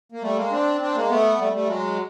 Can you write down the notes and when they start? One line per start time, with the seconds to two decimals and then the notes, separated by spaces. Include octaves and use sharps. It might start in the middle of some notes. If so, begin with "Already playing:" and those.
0.12 A#3
0.22 G3 A3
0.36 G#3 A#3
0.51 C4 D4
0.81 C4 D4
0.95 G#3 A#3
1.09 A3 B3
1.38 G3 A3
1.53 G3 A3
1.67 F#3 G#3